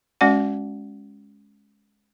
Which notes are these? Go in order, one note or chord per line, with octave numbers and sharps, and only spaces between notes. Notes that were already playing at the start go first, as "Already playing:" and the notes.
G#3 C#4 F#4 D5 F#5